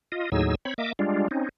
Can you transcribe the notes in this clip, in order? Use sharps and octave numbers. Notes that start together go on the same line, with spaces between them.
F4 D#5
D#2 A2 F#3 D#4 G#4 E6
C4 C#5 B5
A#3 D#5 E5 D6
G3 G#3 D4 F4
C4 C#4 D#4